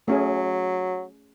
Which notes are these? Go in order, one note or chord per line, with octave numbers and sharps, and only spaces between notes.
F#3 A3 C#4 G#4